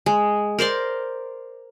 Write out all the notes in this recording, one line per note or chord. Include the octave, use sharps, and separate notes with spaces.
G#3
A#4 C5 D5 C6